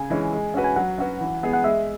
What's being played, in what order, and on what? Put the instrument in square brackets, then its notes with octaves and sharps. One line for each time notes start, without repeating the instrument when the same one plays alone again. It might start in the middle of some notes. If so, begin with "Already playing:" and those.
Already playing: [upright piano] C#3 [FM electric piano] G#5
[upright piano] E3 G#3 C#4
G#3
C#4 F#4 B4
[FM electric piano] G#5
[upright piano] F#3 [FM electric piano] F#5
[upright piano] C#4 F#4 B4
E3
G#3 B3 G#4
[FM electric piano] F#5
[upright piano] G#3 [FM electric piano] E5